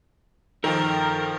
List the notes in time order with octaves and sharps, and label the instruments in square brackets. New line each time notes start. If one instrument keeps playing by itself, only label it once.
[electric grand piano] D#3 F3 [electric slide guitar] A4 G5 [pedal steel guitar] A#4